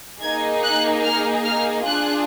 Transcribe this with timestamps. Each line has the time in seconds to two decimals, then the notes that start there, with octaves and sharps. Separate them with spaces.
0.22 A#3 D#4 G#4 G#6
0.63 F#6
1.04 F6
1.45 F6
1.86 D4 F4 G#4 F#6